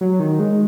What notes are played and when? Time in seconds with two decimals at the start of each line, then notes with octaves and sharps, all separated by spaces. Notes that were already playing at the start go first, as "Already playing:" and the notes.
0.01 F#3
0.20 D#3
0.39 G#3